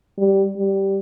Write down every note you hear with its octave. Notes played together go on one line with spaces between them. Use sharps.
G3
G3